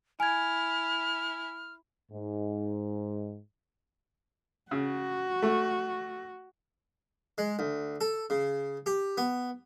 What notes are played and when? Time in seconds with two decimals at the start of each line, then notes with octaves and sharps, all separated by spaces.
0.20 E4 G#5 F6 G#6
2.10 G#2
4.71 C#3 F#4
5.42 A3
7.38 G#3
7.59 D2
8.01 A4
8.30 C#3
8.86 G4
9.18 B3